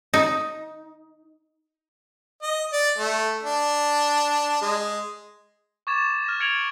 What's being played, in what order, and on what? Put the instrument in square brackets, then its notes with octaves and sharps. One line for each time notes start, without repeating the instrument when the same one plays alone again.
[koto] D#4
[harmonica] D#5
D5
A3
D4
G#3
[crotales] C#6 D6 G#6 A6 E7
F6 A#6
G#6 C#7 D7 F7 F#7